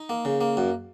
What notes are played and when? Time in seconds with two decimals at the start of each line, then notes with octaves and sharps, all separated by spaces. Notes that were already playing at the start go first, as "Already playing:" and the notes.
Already playing: D#4
0.09 A#3
0.25 C#3
0.41 A#3
0.57 F#2